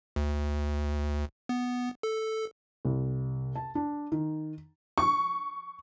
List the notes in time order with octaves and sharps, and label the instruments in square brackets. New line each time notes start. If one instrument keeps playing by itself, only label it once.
[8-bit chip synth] D2
B3
A4
[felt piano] C2
A5
D4
D#3
[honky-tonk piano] C#6